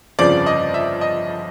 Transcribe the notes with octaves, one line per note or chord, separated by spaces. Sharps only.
G1 F2 C#3 F3 D5
D#5
E5
D#5